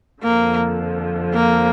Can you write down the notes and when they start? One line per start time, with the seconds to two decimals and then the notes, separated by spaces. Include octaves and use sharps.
0.23 F2 D3 F3 A#3
1.34 A#3